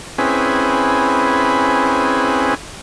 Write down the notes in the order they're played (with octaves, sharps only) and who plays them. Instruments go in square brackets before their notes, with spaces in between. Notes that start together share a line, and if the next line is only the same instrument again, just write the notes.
[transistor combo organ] C4 C#4 E4 G#4 B4